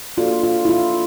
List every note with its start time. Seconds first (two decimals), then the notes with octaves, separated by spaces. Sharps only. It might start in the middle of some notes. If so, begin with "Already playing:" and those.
0.17 A#3 D4 F4 F#4 A4 D5
0.43 F4
0.65 E4
0.69 F4